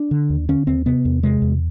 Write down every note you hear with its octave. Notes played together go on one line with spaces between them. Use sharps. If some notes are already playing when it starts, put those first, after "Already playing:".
Already playing: D4
D3
D#2
D3 C#4
D#2 C4
C3 B3
E2
C3 G#3
E2